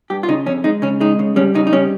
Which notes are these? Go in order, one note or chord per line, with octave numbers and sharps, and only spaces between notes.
G2 G4
F4
C#3 D#4
F2 C#4
G#3 D#4
C#3 C#4
G#3 D#4
C#3
G3 C#4
C#3 D#4
D#4
G3 C#4